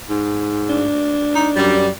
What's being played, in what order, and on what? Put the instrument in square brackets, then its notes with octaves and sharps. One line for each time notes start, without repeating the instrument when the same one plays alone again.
[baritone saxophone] G#2
[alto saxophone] D4
[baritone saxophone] D#4
[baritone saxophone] F#2 [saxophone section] G3